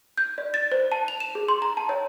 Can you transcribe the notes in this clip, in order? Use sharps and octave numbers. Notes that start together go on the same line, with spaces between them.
G6
D5
A6
C5
A5
F7
E7
G#4
C6
A#5
A5
C#5